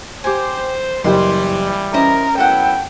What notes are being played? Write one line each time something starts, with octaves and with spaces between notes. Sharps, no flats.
G4 C5 G#5
F#1 E3 G3 G4 C5 G5 C6
C#4 E4 A#4 C5 D#5
F#3 B3 E4 A4 F#5 G5